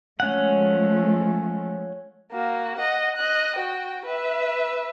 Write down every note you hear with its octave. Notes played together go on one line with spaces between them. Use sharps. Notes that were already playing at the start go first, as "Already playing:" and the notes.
F3 G#3 A3 C#4 F#5
A#3 F#4
D#5 F#5
D#5 F#6
F#4 G5
B4 E5